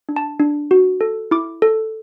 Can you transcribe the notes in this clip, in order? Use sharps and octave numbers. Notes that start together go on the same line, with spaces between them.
D4
A5
D4
F#4
A4
E4 D6
A4